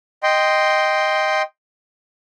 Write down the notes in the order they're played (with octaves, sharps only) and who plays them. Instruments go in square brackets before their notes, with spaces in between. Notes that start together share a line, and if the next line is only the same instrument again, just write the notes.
[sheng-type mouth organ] D#5 G5 C6